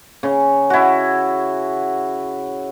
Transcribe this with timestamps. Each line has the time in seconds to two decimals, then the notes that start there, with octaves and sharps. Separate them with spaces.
0.23 C#3
0.70 E4 F#4